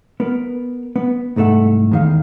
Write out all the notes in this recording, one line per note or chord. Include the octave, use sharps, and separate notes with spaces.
B3 A#4
B3
C2 G#2 A3 A4 F#5
E2 D#3 F5